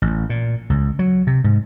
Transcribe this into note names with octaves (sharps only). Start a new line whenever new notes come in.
A1
A#2
C#2
F#3
C3
G#2